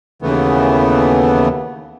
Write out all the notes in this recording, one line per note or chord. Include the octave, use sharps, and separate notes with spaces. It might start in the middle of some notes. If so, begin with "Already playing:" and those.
D#2 C#3 E3 A3 B3